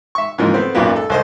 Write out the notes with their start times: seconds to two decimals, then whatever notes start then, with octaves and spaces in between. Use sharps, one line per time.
0.15 E5 C#6
0.38 G#2 C#3 E3 F3 A#3 D#4
0.54 A3 B3 C4
0.75 B1 F#2 A#2 A#3 B3
0.96 A4
1.10 C2 C5 D#5